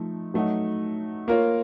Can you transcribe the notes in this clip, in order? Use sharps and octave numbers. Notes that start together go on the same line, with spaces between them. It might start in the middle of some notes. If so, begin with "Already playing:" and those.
Already playing: F3 A3 D#4
F#3 A3 D#4 F#4
A#3 F4 A#4 C#5